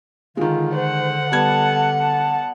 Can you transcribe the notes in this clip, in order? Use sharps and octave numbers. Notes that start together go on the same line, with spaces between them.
D3 D#3 G#3 F4
C5 F#5
G3 B3 A5 G#6
A5